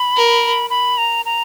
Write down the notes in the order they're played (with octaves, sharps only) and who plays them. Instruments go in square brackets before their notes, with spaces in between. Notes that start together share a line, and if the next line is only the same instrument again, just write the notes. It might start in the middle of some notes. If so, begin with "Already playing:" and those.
Already playing: [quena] B5
[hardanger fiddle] A#4
[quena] B5
A#5
A#5